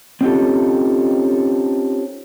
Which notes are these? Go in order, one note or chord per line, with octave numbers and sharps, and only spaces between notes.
C4 C#4 D#4 F4 G4 A4